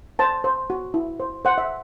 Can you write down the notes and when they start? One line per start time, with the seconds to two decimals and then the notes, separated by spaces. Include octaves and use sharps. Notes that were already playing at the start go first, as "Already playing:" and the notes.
0.19 C5 A5
0.44 C5
0.70 F#4
0.94 E4
1.20 C5
1.45 C5 F#5
1.58 E5